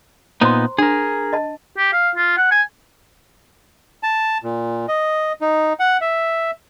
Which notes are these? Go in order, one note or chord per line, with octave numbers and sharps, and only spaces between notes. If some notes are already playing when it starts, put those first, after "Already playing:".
A#2 B3 D#4 C5 A#5 C6
D4 G#4 A#4
D#5 A5
G4
F5
F4
F#5
G#5
A5
A#2
D#5
D#4
F#5
E5